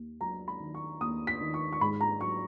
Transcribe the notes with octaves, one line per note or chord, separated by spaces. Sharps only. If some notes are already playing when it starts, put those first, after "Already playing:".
Already playing: D#2
F#3 A#5
B5
D#3
C#6
D#2 D#6
B6
D#3
C#6
C#6
G#2 B5
A#5
F#3 C#6